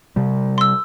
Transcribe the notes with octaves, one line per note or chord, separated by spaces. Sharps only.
C3 G3
C6 E6